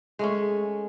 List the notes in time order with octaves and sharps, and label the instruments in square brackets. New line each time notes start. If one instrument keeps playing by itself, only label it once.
[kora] G#3 A3 C#4